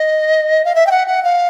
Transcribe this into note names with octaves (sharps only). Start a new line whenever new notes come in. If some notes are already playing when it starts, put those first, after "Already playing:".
Already playing: D#5
F5
E5
G5
F#5
F#5
F5